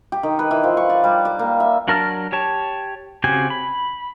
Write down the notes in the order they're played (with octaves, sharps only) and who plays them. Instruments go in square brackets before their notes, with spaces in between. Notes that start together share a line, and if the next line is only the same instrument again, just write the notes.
[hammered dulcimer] G4
D#3
B4
E3
F3
C#6
D5
G3
D5
A#3
E5
[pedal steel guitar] F#3 D4 A#4 A5 F6
G4 C#5 A5
C#3 C4 F#4 G4 G#5
B5